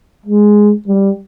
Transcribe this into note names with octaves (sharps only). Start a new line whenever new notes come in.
G#3
G3